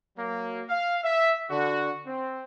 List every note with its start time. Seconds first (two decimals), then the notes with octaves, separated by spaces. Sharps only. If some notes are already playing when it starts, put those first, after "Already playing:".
0.17 F#3 A#3
0.69 F5
1.04 E5
1.50 D3 F#4
2.06 C4